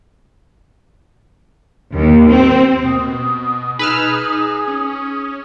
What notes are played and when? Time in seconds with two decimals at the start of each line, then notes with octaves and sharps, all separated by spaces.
1.92 D#2
2.28 C4
2.84 B2 D#6
3.79 D#4 G#4 B4 E6 F6
4.68 C#4